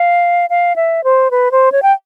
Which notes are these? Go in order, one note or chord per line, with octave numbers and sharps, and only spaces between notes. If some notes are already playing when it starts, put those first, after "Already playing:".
Already playing: F5
F5
E5
C5
B4
C5
C#5
G5